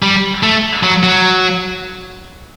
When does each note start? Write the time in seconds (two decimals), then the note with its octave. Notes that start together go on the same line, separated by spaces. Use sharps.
0.03 G3
0.43 A3
0.83 F#3
1.03 F#3